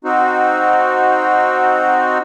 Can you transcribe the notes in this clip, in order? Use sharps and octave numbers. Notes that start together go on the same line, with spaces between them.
C4 D#4 F#4